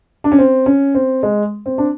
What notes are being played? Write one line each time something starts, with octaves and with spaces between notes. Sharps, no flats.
D4
C#4
C4
C#4
C4
G#3
C4
D4